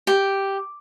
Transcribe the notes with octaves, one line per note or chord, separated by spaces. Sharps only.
G4